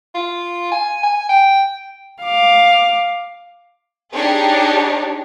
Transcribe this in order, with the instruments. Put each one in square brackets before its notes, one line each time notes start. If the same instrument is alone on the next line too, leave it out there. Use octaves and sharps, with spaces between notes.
[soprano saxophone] F4
G#5
G#5
G5
[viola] F5 D6
[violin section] D4 D#4 G4 G#4 C#5